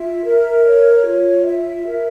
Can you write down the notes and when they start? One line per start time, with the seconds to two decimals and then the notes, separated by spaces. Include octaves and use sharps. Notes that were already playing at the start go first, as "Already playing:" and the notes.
Already playing: F4 E5
0.25 A#4
0.65 C#5
1.05 F4
1.45 E5
1.86 A#4